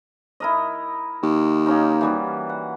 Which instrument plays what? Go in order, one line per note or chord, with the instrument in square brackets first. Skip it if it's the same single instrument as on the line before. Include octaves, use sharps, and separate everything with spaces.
[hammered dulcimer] E4 A#4 D#5
[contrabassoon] D#2
[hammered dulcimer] A#3 C#4 D#4
E3 G3 F#4
F#5